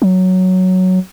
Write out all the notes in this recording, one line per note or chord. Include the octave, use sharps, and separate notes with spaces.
F#3